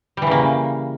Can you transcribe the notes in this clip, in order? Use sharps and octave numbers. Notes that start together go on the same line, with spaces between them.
C#3 E3 G3 A#3